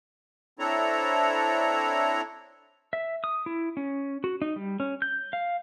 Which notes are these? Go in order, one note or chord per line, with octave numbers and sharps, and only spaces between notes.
C4 D4 E4 A4 C#5 A#5
E5
D#6
E4
C#4
F#4
D#4
G3
C#4
G6
F5